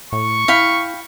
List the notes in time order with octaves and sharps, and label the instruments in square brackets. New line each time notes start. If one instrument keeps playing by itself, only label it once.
[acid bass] A2 [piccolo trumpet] C#6
[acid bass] E4 [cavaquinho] F5 G5 B5